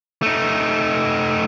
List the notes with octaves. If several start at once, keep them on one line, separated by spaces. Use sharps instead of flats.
A3 D#4